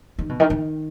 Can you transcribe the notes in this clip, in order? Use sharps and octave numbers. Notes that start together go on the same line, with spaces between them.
D#3
B2
D#3
D#3